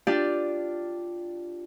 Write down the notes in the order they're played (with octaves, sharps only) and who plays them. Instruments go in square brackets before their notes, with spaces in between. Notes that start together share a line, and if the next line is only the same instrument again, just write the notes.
[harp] D4 F4 G4 D5